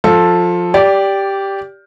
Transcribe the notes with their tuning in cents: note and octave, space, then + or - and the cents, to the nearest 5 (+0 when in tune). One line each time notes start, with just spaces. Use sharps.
F3 +15 F4 +15 A4 +0
G4 +0 D5 -15